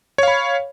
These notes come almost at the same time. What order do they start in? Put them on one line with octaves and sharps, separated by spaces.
C#5 F5 B5